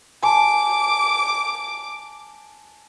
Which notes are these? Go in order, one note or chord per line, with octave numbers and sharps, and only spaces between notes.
G#5 A5 D6